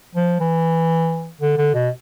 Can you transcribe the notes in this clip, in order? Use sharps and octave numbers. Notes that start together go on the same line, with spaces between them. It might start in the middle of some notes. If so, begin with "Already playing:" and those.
F3
E3
D3
D3
B2